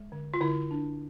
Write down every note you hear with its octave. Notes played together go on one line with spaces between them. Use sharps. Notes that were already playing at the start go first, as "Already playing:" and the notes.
Already playing: G#3
D3
F4
D3 E4
D4